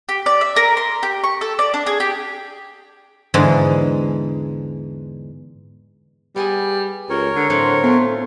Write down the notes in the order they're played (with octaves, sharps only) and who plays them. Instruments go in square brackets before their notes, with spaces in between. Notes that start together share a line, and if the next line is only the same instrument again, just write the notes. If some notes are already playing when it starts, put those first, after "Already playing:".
[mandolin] G4
D5
E5
A#4
C6
G4
C#6
A4
D5
D4
G#4
G4
[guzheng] E2 G#2 D3 G#3
[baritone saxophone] G3 [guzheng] B3 G#4 G#5
[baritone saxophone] C#2 [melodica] A#4 C#5
[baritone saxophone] D3
[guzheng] A2 F#3 C4 [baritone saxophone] D3
[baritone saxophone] A3 [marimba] B3 [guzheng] F4